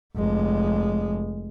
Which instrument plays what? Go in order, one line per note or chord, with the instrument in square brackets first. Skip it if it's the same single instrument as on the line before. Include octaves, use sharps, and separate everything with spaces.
[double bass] F1 G#3